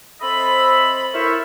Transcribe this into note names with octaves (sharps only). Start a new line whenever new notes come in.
C4 A4 C5 D#5 E5 B5
E4 A4 A#4 C5 C#5 E5